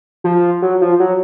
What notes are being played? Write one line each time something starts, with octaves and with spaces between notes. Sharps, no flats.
F3
F#3
F3
F#3